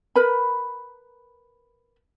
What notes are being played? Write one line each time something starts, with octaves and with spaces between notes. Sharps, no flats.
A#4 B4 B5